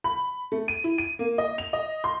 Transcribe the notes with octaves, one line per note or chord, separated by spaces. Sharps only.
B5
A3
D#7
E4
D#7
A#3
D#5
F7
D#5
C6